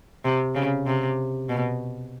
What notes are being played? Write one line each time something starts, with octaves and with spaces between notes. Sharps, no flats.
C3
C#3
C3
B2